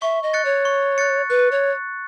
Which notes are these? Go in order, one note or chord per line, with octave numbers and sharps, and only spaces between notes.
E5 C#6
D#5
F#6 A6 C#7
C#5
C#6
F#6 A6 C#7
B4 F#6
C#5